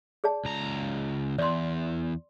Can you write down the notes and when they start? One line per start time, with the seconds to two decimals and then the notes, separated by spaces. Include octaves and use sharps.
0.24 G#4 D5 A5
0.45 C#2 A#5
1.38 E2 D5 C6